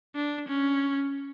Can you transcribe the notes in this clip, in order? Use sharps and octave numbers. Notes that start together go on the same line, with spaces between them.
D4
C#4